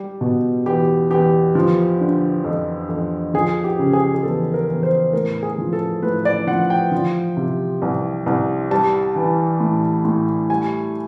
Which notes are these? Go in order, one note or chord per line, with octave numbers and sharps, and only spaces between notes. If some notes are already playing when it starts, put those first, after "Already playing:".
Already playing: G3 G4
B2
E2 G4
E2 G4
F3
D3
F2
F2
F3 G#4
G4
C#3
G#4
G#4
E2 A4
A#4
E2
C5
A2 A#4
G#4
F3
A4
A2 B4
D5
F3 F#5
G5
F3
C3
C2
C2
G3 A5
E3
A2
A2
G3 G#5